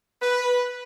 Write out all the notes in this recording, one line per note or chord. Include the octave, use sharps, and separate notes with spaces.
B4